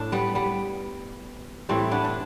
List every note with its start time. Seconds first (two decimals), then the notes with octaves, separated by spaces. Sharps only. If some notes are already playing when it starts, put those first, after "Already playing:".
Already playing: A2 D4
0.12 G3 B3
0.35 G3 B3
1.69 A2 E3 G3 A3 C4
1.91 B3 D4
2.05 D4